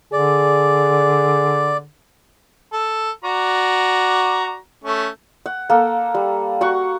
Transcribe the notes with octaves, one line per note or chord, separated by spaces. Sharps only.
D3 G#4 D5
A4
F#4 D5 A#5
A3 C#4
F#5
A#3 A4
G3
F#4 F#5 C#6